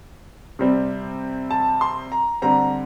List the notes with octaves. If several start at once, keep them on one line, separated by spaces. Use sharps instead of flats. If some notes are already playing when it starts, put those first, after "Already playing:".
C3 G3 C4
A5
C6
A#5
D3 G3 C4 A#5